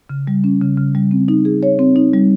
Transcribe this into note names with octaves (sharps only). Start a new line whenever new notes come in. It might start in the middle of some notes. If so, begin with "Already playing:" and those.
C#3
G3
C#4
C#3
C#3
G3
C4
D#4
G#4
C#5
C4
D#4
G3